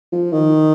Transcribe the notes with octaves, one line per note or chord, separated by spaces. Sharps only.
F3
D#3